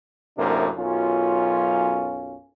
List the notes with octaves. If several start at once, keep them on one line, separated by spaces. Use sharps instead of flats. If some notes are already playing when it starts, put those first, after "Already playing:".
F#2 A2 C3 A#3 D4
B1 F#2 C#4 F4